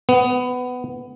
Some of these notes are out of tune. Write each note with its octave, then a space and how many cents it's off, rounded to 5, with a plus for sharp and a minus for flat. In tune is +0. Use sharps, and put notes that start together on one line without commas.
B3 +15